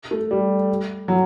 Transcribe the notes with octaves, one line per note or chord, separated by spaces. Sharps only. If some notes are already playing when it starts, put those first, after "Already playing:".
A3
G3
F#3